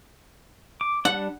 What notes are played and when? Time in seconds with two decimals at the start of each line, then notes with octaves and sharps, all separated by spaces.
0.81 D6
1.05 G3 D4 F#5